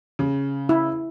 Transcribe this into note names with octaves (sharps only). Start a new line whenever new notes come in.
C#3
E4